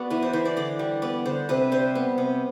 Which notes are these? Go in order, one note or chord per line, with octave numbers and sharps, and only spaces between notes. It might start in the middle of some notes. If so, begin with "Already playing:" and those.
Already playing: B3 F#4 D5
E3 B4
C5
E3 C5
D5
D3 D5
G3
B3 D5
D3 C5
C3 B4
G3 C5
B3
C3